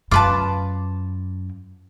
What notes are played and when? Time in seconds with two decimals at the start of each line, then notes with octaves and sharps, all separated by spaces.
0.11 F#2 F4 B4 A5 D6